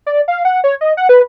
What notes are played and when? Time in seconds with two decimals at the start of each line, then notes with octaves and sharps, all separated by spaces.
0.06 D5
0.28 F5
0.45 F#5
0.64 C#5
0.81 D#5
0.97 F#5
1.09 B4